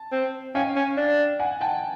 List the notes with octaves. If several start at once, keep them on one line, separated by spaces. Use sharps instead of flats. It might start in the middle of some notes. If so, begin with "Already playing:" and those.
Already playing: A5
C4
C#4 F5 G5
C#4
D4
F#5 G#5
G5 A5